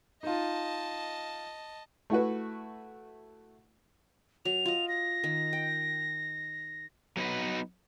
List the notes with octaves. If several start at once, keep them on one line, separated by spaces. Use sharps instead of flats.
D#4 F4 D#5 A5
A3 E4 F#4 B4
F#3 F7
F4 D#5
A#6
D#3
G5
F#3 B3 D#4 B4